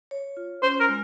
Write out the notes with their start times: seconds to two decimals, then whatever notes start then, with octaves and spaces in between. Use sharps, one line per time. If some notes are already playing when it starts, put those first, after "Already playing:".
0.11 C#5
0.37 F4
0.63 C#4 C5
0.80 A#4
0.89 G#3